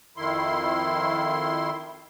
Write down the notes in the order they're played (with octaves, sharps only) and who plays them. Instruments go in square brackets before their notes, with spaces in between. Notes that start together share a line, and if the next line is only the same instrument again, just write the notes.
[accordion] F2 D#3 E4 C6